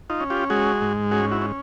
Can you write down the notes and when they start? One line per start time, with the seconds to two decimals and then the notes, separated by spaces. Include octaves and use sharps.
0.10 D#4 F4
0.20 C#4
0.30 F4 G4
0.50 G#3 F#4 G#4
0.81 G#2
1.11 C#4 F#4 G#4
1.31 E4 F#4
1.42 C#4